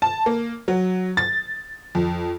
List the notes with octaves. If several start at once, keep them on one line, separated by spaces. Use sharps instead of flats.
A5
A#3
F#3
A6
F2